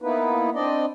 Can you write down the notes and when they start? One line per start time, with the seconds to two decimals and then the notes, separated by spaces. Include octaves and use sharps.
0.02 A#3 B3 D#4 E4 B4
0.55 C4 D4 D5 D#5